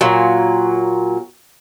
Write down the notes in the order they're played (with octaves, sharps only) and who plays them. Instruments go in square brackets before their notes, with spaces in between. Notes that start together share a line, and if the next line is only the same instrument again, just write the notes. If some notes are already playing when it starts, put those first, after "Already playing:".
[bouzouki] A#2 F#3